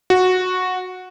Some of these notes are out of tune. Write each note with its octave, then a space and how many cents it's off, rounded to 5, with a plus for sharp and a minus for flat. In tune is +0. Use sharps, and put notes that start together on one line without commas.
F#4 -10